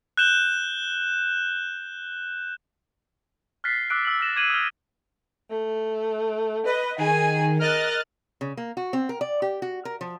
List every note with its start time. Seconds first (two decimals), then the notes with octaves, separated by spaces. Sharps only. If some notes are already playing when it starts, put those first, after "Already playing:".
0.17 F#6 G6 E7 G7
3.64 F6 F#6 A6 B6 C7
3.90 D6 E6 F#6 D7
4.05 E6 F#7
4.19 E6 F6 A6 A#6 E7
4.36 D6 G#6 C7 D#7 F#7
4.50 D#6 F6
5.49 A3
6.65 B4 D#5
6.98 D#3 G#4 G#5
7.59 A#4 D#5 F6 F#6 A6
8.41 C#3
8.57 A#3
8.77 F#4
8.93 C4
9.09 A#4
9.21 D5
9.42 G4
9.62 F#4
9.85 A#4
10.01 F3